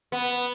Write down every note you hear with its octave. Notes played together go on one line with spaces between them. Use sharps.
B3